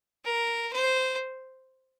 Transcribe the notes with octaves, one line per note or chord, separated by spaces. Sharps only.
A#4
C5